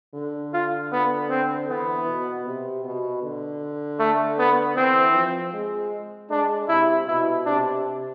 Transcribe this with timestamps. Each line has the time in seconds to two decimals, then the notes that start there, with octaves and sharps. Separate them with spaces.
0.15 D3
0.54 F4
0.92 B3
1.30 C4
1.69 E3 B3
2.08 B2
2.46 C3
2.84 B2
3.23 D3
4.00 A3
4.39 B3
4.77 E3 C4
5.15 F3
5.54 G#3
6.30 G#3 D4
6.69 C3 E4
7.08 B2 E4
7.46 C3 D4